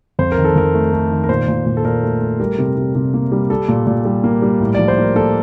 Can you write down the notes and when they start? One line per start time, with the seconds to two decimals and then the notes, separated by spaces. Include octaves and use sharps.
0.19 F2 C5
0.32 A#4
0.38 D#3
0.45 A4
0.56 F2 A#4
0.74 A3
0.93 A3
1.11 D#3
1.24 A#4
1.29 A#2 C5
1.48 A#2
1.66 A#2
1.77 A4
1.85 A#2 A#4
2.03 A3
2.21 A3
2.40 G3 A#4
2.58 C3
2.77 C3
2.95 C3
3.14 A#3
3.32 G3
3.50 G3 A4
3.68 A#2
3.87 A#2
4.05 G3
4.24 A#3
4.42 G3
4.60 A2
4.75 F3 D5
4.88 C5
4.98 A#3 A#4
5.15 A#3 A4